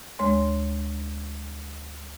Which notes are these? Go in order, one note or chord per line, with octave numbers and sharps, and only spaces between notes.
D2 G#3 C#5 C6